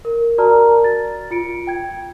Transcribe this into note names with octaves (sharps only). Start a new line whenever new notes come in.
A#4
F#4 A#4 D5 A5 A#5 F6
A6
F4 C#7 D7
G5 G#6